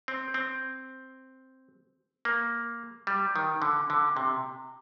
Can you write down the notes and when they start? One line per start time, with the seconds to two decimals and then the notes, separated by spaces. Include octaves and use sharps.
0.08 C4
0.34 C4
2.25 A#3
3.07 G3
3.36 D#3
3.62 D3
3.90 D3
4.17 C3